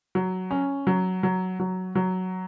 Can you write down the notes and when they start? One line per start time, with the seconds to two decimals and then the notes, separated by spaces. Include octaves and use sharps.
0.15 F#3
0.51 C#4
0.87 F#3
1.23 F#3
1.60 F#3
1.95 F#3